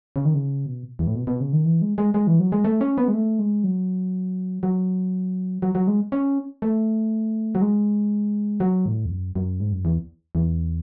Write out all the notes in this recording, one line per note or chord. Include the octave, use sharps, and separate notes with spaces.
C#3
D#3
C#3
B2
E2
A2
B2
B2
C#3
D#3
E3
G#3
G#3
G#3
E3
F#3
G#3
A3
C#4
B3
G#3
A3
G#3
F#3
F#3
F#3
F#3
G#3
C#4
A3
F#3
G#3
F#3
A2
E2
F#2
F#2
G#2
F#2
E2
E2